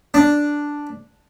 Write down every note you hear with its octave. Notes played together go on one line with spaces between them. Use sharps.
D4